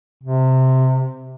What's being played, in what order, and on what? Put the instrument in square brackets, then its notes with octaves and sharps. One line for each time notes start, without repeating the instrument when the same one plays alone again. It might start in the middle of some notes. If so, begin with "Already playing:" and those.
[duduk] C3